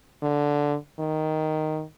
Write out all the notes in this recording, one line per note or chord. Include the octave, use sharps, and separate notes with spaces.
D3
D#3